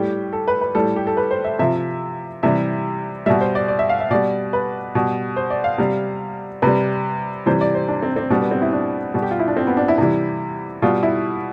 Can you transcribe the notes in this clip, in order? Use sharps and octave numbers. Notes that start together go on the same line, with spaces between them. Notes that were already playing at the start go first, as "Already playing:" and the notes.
Already playing: A2 G3 G4
A4
B4
B4
A2 G3 A4
G4
A4
B4
C5
E5
C3 F3 E5
C3 E3 G3 E5
B2 G3 E5
C5
D5
D5
E5
F5
E5
B2 G3 D5
B4
B2 G3
C5
D5
F5
C3 G3
C3 G3 B4
C3 E3 G3 C5
D5
C5
D4
C4
C4
B2 G3 D4
B3
C4
E4
D4
B2 G3
G4
F4
E4
D4
C4
B3
D4
E4
C3 E3 G3
B2 G3 F4
E4